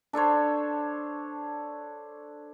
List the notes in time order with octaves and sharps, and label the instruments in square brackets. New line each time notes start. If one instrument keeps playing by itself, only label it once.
[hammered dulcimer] D4 A4 C5 C#5